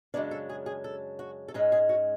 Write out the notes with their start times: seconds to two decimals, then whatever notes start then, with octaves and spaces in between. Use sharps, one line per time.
0.14 F#2 C#3 E3 G#3 D4 D5
0.31 A4
0.49 G#4
0.66 G#4
0.84 A4
1.19 F#4
1.48 A4
1.54 G#2 G#3 C#4 G#4
1.72 G#4
1.89 F#4